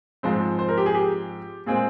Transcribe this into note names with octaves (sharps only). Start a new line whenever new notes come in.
G#2 F3 G#3 C4 C5
C5
A#4
G4
G#4
G4
A#2 G#3 C4 G#4